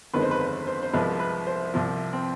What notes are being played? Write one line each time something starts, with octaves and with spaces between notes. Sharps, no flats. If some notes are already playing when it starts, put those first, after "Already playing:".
G1 F2 D#3 G#3 B4
C5
B4
C5
C5
C2 C3 F3 G#3 B4
B4
C5
C2 C3 F3
C4